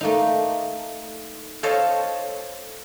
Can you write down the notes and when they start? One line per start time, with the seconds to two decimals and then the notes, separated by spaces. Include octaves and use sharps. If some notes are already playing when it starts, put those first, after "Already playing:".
0.01 A3 A#3 D#4
1.63 A4 C5 C#5 D#5 F5 A5